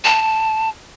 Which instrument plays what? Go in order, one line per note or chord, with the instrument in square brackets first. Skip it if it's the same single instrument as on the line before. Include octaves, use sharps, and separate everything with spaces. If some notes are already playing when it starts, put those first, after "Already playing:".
[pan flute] A5